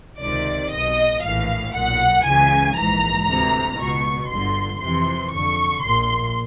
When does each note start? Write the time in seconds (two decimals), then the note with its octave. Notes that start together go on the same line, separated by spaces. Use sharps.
0.20 C#2 C3 D#3 D5
0.72 B1 B2 D#5
1.22 A#1 A2 E3 F5
1.73 B1 A#2 F#5
2.24 C#2 C#3 E3 G#5
2.75 A#1 G#2 E3 A#5
3.27 D2 C3 E3
3.78 C#2 B2 C#6
4.29 G1 G2 D3 C6
4.80 F2 C3 E3 C6
5.31 F2 D3 C#6
5.82 A#1 A#2 C6